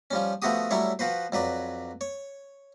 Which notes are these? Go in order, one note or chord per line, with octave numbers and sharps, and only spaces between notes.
F3 G3 C#4
F3 A3 B3 F#4 G4 D#6
F#3 G3 A3 E4 C#5
F3 F#4 B4 C5
F2 F#3 B4 D5
C#5